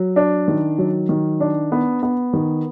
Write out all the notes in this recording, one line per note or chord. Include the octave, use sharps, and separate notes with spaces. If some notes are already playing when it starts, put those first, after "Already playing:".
Already playing: F#3
D4
D#3
F#3
D#3
D4
B3
B3
D#3